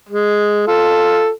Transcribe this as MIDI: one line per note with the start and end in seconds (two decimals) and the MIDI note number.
0.09 0.64 56
0.67 1.29 65
0.67 1.29 69